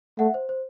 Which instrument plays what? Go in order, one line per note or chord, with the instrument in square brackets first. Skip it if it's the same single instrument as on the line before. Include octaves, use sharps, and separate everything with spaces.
[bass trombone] A3 [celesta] E5 F#5
[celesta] C5
C5